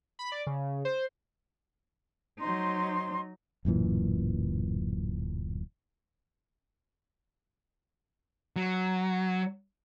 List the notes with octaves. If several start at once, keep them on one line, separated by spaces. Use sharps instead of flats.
B5
D5
C#3
C5
F#3 D#4 C5 C6
D1 F#2 A#2 E3
F#3